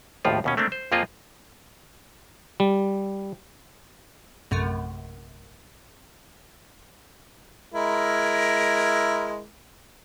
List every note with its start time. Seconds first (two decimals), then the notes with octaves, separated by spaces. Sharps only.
0.25 G#1 D#2 A2 F3 F4
0.44 D#2 B2 C#4
0.57 A3 A#3 C4 D4
0.72 C5
0.92 F2 F3 A#3 F4 G#4 D#5
2.60 G3
4.51 A#1 F#2 C3 A3
7.73 G#3 E4 A#4